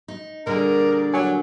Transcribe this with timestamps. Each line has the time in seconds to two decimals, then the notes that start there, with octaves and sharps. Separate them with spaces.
0.08 D#4
0.47 A#2 D3 G3 G#4 A#4 D5
1.14 F#3 G#5